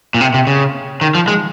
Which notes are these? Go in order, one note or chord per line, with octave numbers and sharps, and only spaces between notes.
A#2
C3
C3
C#3
D#3
F3
G#3